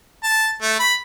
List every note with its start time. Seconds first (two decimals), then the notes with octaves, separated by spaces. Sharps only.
0.23 A5
0.62 A3
0.79 B5